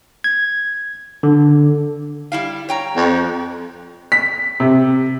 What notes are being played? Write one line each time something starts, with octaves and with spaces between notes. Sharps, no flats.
G#6
D3
G3 E4 F5
C#5 G5 A#5
F2
B6
C3